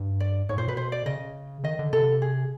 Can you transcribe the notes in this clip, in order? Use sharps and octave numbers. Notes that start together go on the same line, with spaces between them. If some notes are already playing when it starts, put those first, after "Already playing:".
Already playing: G2
D5
G#2 C#5
A#2 C5
B2 B4
C5
D5
C#3 D#5
D#3 D#5
D3
C3 A4
G#4